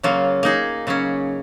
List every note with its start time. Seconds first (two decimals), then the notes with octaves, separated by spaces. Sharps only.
0.03 C#3 F#3 A#3 F4
0.43 A#3 D#4 G#4
0.87 C#3 F#3 C#4